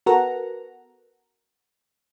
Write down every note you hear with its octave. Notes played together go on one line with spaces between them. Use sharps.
B3 F#4 A4 A#4 F#5 A#5